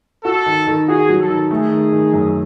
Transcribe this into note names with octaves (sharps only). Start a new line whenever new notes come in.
F#4 A4
D#3
D#3
F#4 G#4
F#3
A4
D#3
A3 G#4
D#3
D#3
F#2